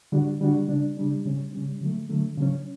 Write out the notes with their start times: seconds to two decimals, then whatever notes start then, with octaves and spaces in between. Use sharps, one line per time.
0.12 D3 G3 D4 F#4
0.40 D3 G3 D4 F#4
0.68 C#3 G3 D4
0.97 C#3 G3 D4
1.25 C#3 G3 C#4
1.53 C#3 G3 C#4
1.81 D3 F#3 A3
2.09 D3 F#3 A3
2.37 C#3 F#3 C#4